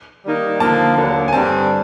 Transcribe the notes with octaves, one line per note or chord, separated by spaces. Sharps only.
D#3 G3 A#3 D#4
D3 F3 A#3 A5
D#2 D3 F#3 A#3
G#5
G2 D3 G3 C4 A5